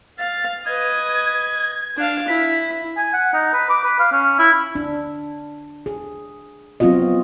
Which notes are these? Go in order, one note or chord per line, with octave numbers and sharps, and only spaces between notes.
F5 A6
B4 D#5 G#6
D4 F5
E4 B6
G#5
F#5
D#4
B4
D6
B4
F5
C#4
E4
D4
G#4
F#3 B3 C4 F4 F#4 D#5